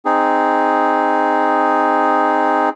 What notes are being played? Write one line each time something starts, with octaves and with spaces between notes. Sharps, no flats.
C4 D#4 G#4